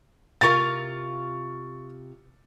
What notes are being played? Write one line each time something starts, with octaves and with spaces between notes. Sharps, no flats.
C3 F4 A#4 C#6 A6